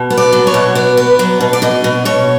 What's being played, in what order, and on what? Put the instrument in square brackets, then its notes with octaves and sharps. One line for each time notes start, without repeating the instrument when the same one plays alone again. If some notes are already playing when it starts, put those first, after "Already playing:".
Already playing: [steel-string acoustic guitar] B2
B3
D5
F#3
C#5
B2
B3 D5
B3
F#3
B2
D5
B2 D#5
B2
B2 C#5